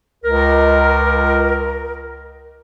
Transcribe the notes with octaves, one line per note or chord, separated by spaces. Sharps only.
C#2 A#4